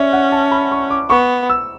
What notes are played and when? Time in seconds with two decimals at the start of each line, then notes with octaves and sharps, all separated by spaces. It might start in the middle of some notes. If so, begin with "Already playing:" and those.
Already playing: C#4 D5 E5
0.13 F#5
0.32 A5
0.52 B5
0.72 C#6
0.90 D6
1.10 B3 C#6
1.50 E6